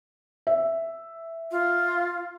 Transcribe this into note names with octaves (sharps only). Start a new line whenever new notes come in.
E5
F4